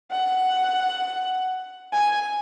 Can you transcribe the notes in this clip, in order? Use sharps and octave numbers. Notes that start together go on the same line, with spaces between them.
F#5
G#5